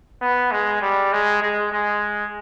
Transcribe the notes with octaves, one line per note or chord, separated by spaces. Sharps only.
B3
G#3
G3
G#3
G#3
G#3